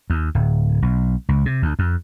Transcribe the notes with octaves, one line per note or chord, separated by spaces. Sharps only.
D#2
D1
B1
C#2
C3
D2
F2